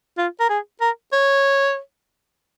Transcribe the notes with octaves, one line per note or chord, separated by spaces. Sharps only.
F4
A#4
G#4
A#4
C#5